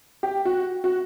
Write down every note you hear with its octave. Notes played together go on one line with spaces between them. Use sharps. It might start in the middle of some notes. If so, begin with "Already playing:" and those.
G4
F#4
F#4